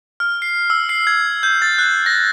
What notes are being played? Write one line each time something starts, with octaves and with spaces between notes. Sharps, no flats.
F6
C7
E6
C7
G#6
G6
A6
F#6
A#6